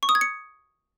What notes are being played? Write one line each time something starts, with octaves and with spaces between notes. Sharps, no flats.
C#6
D#6
G#6
C#7